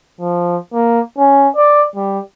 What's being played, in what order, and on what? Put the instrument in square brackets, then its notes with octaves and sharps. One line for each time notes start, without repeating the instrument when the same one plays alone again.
[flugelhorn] F3
A#3
C#4
D5
G3